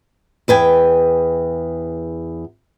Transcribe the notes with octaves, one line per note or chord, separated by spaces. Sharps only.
E2 B4 G5 G#5